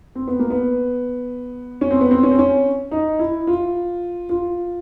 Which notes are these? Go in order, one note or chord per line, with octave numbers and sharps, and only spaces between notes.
C4
B3
A#3
B3
C#4
C4
B3
C4
C#4
C4
C#4
D#4
E4
F4
F4